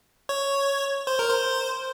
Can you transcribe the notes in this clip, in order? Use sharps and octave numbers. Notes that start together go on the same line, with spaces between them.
C#5
C5
A#4
C5